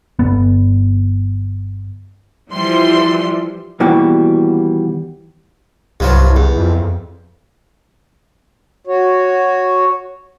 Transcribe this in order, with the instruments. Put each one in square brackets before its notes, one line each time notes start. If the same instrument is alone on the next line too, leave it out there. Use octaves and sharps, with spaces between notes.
[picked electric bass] G1 B3
[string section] E3 F3 G3 C6
[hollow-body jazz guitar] D#2 B2 E3 G3 F#4 G4
[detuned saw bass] C2 [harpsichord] G2 F3 F#3
[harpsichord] E2
[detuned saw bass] F2
[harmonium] F#4 C#5